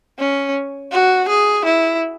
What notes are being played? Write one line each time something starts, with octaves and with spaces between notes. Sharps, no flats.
C#4
F#4
G#4
E4